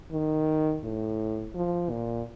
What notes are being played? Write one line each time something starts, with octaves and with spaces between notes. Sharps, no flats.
D#3
A2
F3
A#2